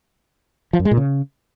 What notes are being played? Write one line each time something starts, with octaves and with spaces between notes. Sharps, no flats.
F3
F#2
G#3
A#2
C#3